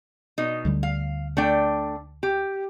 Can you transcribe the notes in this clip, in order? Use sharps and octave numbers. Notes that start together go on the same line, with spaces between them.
B2 D#4
D2 D3 G3
F5
A3 D4 G5
G4